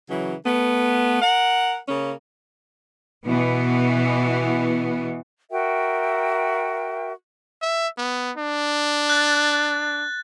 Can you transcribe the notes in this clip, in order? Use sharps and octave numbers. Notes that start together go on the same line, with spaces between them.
C#3 E3 F#3
A3 B3
A#4 F#5
C#3 A#3 C#4
B2 E3 B3
F#4 A#4 E5 G5
E5
B3
D4
F#6 A6